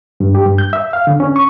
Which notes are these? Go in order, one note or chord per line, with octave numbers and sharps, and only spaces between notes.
G2
G4
G2
G6
E5
F5
D3
C#4
C#6